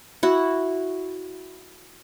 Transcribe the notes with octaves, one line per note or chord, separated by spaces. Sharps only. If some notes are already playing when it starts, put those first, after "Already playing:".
E4 F#4